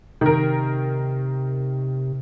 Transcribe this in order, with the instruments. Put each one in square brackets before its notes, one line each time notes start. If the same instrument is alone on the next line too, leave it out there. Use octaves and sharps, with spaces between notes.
[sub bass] C3 [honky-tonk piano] D#3 A#4